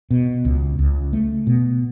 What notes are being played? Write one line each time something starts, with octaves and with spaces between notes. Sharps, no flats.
B2
C#2
C#2
A3
B2